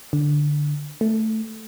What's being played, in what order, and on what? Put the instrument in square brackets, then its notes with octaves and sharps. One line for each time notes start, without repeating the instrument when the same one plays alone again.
[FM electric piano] D3
A3